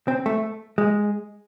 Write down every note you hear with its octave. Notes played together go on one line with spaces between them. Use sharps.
C4
A3
G#3